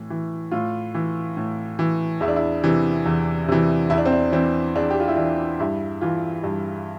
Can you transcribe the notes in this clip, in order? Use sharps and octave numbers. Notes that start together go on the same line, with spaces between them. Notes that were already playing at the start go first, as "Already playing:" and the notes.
Already playing: A2 E3
E3
A2 F4
E3
A2
E3
E2 E4
D4
E4
C3 E3
E2
C3 E3
E2 E4
D4
C4
D4
E3 C4
E2 D4
G4
F4
E4
E3 D4
G2 E4
E3 F4
G2